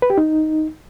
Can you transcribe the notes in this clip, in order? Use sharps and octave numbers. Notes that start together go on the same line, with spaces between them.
B4
G4
D#4